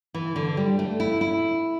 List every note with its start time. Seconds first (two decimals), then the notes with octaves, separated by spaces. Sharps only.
0.14 E3
0.36 D3
0.57 G3
0.79 A3
1.00 E4
1.21 E4